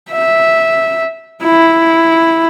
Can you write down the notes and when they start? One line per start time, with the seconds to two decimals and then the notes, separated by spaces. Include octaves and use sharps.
0.12 E5
1.43 E4